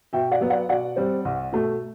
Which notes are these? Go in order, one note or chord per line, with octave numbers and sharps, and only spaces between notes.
B2 E5 G5
D5 F#5
F#3 B3
D5 F#5
B2 D5 F#5
G3 C4
C2
B2 A3